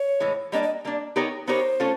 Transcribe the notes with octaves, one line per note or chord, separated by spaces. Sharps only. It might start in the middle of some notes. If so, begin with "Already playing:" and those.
Already playing: C#5
A2 E3 G#3
G3 A#3 D4 D#5
D#5
G3 A#3 D4
B3 D#4 G4 A#4 C#5
B3 D#4 G4 A#4 C5 C#5
A3 C#4 F4 A4